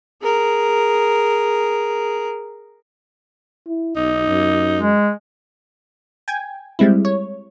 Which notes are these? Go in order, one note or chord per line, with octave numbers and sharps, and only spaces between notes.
G#4 A#4
E4
B1 D#4
F#2
G#3
G5 G#5 G#6
G3 G#3 C4 E4
C#5